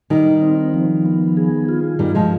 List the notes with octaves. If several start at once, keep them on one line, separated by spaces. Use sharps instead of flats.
D#3 G3 D#4
C4
F3
B3
G#4
F4
G2 D#3 G3
F3 G#3